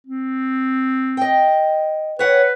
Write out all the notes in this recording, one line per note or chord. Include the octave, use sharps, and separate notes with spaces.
C4
D#5 G5
B4 C#5 F#5